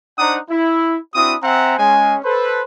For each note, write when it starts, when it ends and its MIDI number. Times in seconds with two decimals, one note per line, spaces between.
0.19 0.38 62
0.19 0.38 63
0.19 0.38 72
0.19 0.38 78
0.19 0.38 82
0.19 0.38 87
0.50 0.97 64
1.15 1.35 60
1.15 1.35 62
1.15 1.35 64
1.15 1.35 66
1.15 1.35 87
1.43 1.78 60
1.43 1.78 72
1.43 1.78 76
1.43 1.78 78
1.43 1.78 80
1.43 1.78 82
1.79 2.17 56
1.79 2.17 61
1.79 2.17 80
2.25 2.62 69
2.25 2.62 71
2.25 2.62 72